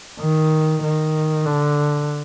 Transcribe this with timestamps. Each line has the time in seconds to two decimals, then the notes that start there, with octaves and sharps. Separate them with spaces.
0.20 D#3
0.83 D#3
1.46 D3